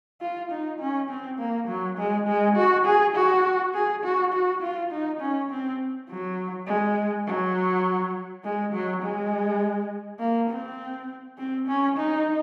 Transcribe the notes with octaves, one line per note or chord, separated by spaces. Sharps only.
F4
D#4
C#4
C4
A#3
F#3
G#3
G#3
F#4
G#4
F#4
G#4
F#4
F#4
F4
D#4
C#4
C4
F#3
G#3
F#3
G#3
F#3
G#3
A#3
C4
C4
C#4
D#4